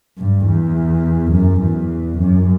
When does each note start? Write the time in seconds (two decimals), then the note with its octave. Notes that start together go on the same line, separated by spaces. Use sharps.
0.18 G2
0.46 E2
1.32 F#2
1.61 E2
2.18 F#2